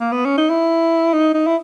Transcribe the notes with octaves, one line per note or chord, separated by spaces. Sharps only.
A#3
B3
C#4
D#4
E4
D#4
D#4
E4